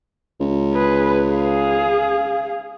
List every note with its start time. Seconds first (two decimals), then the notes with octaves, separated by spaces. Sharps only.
0.40 C#2
0.74 G#4 B4
1.32 G#4 F5